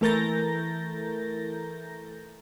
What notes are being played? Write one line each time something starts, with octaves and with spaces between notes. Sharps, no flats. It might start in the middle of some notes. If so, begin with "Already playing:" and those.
E3 A3 A#4 G6 A6 A#6